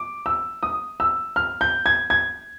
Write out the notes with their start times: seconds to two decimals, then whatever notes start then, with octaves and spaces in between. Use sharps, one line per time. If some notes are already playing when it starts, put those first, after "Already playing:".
Already playing: D6
0.26 E6
0.63 D#6
1.00 E6
1.36 F6
1.61 G6
1.86 G#6
2.10 G#6